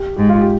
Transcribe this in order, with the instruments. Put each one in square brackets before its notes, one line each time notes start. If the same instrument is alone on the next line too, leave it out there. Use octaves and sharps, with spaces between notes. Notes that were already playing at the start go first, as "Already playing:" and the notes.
Already playing: [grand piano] G4
[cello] G#2 [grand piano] G4
[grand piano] F4
G4